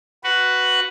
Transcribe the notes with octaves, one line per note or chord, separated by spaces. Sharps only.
F#4 B4 F#5